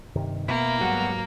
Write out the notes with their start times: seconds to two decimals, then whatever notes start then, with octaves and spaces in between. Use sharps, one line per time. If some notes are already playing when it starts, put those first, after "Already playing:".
0.16 G2 C3 D#3
0.48 B2 A#3 B3 E4
0.81 G#2 F#3 G3 B3 F#4